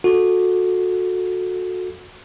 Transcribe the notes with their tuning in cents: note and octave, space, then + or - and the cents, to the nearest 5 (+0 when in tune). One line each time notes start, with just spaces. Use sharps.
F#4 -20 A4 +0